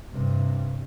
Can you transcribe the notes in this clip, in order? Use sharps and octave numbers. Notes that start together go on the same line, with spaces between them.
G2 C3